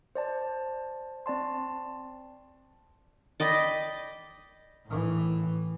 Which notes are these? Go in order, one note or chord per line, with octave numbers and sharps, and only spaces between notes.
C5 D5 A5
C4 D5 A5 C6
D5 D#5 G5 B5
A2 E3